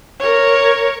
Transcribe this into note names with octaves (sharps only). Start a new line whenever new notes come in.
A#4 C#5